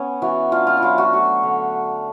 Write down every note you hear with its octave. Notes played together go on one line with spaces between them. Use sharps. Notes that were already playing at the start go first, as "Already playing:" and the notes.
Already playing: B3 C#4
E3 F#4
D4 F4
F4
E4
F#3 F4
F#4
A3 F#4
D3